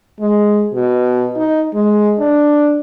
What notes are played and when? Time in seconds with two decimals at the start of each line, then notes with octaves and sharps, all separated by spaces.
0.20 G#3
0.74 B2
1.36 D#4
1.74 G#3
2.19 D4